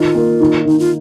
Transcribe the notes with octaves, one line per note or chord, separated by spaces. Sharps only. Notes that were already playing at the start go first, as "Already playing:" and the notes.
Already playing: D#3 F4
A#3
D#3
D#3 D#4
F4